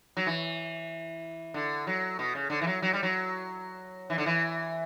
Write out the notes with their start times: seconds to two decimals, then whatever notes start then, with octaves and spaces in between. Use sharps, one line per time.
0.17 F#3
0.27 E3
1.54 D3
1.87 F#3
2.19 B2
2.35 C#3
2.50 D3
2.61 E3
2.67 F#3
2.82 F#3
2.93 G3
3.03 F#3
4.10 E3
4.18 D3
4.26 E3